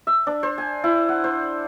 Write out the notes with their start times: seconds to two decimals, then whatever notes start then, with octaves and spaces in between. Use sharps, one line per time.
0.07 E5
0.27 D4
0.43 C5
0.58 G#5
0.84 E4
1.09 F#5
1.24 C5